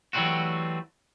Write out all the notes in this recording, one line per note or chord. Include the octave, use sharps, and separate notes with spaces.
E3 F#3 G3 A3 C4 F#4